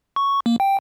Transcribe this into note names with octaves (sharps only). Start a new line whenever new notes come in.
C#6
A#3
G5